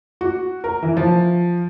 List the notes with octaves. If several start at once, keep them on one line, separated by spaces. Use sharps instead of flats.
F#4
A#4
E3
F3